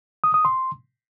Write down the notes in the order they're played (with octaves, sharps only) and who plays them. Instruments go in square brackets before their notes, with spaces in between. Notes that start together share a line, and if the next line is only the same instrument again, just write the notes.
[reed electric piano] D#6
D#6
C6